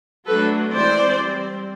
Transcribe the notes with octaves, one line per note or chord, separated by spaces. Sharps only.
F#3 A3 D4 A4 B4
E3 G#3 C4 C5 D5
G3 C4